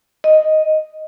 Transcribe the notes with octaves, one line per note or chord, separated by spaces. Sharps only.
D#5